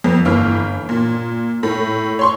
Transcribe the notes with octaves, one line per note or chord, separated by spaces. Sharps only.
F2 B3
G1 E3 A#3 F6
A#2
A2
C#5 C6 C#6